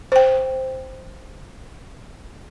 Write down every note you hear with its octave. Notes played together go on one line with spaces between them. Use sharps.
C5 G5